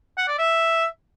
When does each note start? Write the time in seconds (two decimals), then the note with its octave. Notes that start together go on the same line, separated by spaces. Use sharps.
0.18 F#5
0.28 D5
0.39 E5